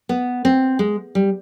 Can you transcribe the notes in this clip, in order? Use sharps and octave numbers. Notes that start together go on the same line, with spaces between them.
B3
C4
G#3
G3